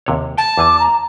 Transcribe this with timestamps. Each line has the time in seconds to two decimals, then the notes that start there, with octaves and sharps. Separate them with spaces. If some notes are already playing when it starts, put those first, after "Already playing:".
0.06 D#2 C3 C#5
0.38 G5 A5
0.57 E2 E3 G#5 D6
0.80 A#5